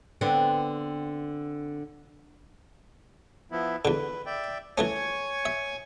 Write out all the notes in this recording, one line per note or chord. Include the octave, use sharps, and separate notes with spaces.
D3 B3 C4
F3 B3 E4
E2 D3 B4
D5 E5 G5
E3 A3 C#4 C#5 G#5 C#6
E5